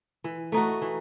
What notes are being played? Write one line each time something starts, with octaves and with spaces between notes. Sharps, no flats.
E3
A3 D#4 F#4
E3